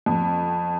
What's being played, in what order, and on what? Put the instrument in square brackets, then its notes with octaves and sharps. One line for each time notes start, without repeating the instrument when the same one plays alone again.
[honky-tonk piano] F2